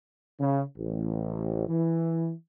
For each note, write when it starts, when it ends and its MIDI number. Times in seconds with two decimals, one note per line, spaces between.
0.39 0.63 49
0.78 1.65 33
1.68 2.33 52